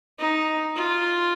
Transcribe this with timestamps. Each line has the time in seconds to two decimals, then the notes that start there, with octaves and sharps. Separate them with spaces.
0.19 D#4
0.76 F4